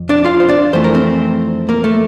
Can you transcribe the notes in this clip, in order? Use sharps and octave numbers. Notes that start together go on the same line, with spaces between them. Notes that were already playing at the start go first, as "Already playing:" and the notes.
Already playing: F2
D4 D5
F4 F5
C5
D4 D5
F2 E3 A3 C5
A#4
C4 C5
A#3 A#4
A3 A4